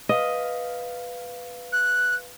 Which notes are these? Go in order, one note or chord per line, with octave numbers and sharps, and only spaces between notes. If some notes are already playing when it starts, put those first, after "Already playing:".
B4 D#5 F5
F#6